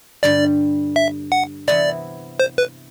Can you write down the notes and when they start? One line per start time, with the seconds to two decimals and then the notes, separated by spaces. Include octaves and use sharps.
0.23 G2 D3 G3 D5
0.96 E5
1.32 F#5
1.68 C3 E3 B3 E4 D5
2.40 C5
2.58 B4